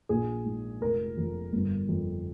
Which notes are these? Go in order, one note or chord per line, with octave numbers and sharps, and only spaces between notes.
A#1 G#4
G#2
F1 A#4
F2
G1
F2